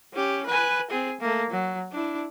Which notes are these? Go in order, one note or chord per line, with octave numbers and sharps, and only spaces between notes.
C#4 G4
B4 G#5
C4 G#4
A3 A#3
F#3
D4 E4